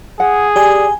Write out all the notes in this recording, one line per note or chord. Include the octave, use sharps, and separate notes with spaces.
G#4 F#5
G4 D5 G#5